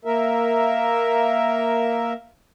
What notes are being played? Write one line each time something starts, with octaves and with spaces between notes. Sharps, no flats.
A#3 A#4 E5